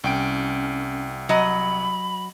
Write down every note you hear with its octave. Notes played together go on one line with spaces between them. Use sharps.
C2 C#4 G5 D7
F#3 D#5 B5